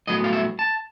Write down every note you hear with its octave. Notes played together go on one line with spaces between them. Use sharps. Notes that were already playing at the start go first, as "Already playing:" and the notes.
A2 F#3 B3 D#5
F5
E5
A5